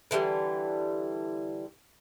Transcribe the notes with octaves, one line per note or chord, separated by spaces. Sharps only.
D3 E3 F#3 G3